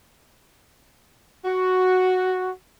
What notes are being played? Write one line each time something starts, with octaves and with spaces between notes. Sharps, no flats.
F#4